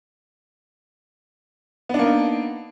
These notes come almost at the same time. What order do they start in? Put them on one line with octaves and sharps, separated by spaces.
B3 D4 A#3 D#4